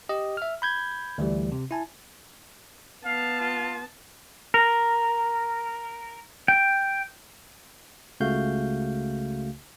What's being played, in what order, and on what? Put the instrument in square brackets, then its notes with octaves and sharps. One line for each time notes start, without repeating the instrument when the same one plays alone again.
[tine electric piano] G4 D#5
E5 F6
B5 G6 G#6
D2 E3 G3
C3
E4 G#5 A5
[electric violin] B3 A5 [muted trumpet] F5
[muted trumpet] F4
[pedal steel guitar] A#4
G5
[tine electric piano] C#2 C#3 A3 F#4 F5 G6